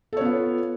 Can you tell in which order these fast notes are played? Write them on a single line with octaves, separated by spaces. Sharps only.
A4 C#5 B3 F4